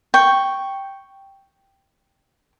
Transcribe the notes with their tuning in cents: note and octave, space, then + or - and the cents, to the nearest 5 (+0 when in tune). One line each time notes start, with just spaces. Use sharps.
G5 +0 C#6 +0